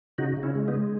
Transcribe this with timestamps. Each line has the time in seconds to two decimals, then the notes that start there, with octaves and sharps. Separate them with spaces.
0.18 C#3 D#4 F#4
0.37 C#3
0.43 C#4 E4
0.55 G#3
0.68 B3 D#4
0.74 G#3